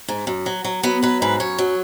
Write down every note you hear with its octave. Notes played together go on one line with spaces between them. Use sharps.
G#2
F#2
F#3
F#3
F#3 B3
F#3 B4
G#2 B4
F#2 C#5
F#3